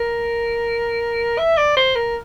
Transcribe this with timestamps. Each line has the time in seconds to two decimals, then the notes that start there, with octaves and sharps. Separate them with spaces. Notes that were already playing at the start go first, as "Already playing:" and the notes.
Already playing: A#4
1.38 E5
1.58 D5
1.77 C5
1.96 A#4